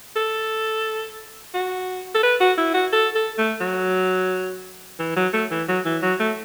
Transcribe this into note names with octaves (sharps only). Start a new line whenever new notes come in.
A4
F#4
A4
B4
F#4
E4
F#4
A4
A4
A3
F#3
E3
F#3
A3
E3
F#3
E3
F#3
A3